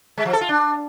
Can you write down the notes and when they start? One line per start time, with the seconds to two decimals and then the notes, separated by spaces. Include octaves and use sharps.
0.18 G#3
0.25 F3
0.33 A4
0.41 F4
0.49 D4